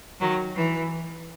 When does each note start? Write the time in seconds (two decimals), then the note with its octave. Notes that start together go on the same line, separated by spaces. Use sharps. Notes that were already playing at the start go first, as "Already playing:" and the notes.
0.20 D#3 F#3
0.55 E3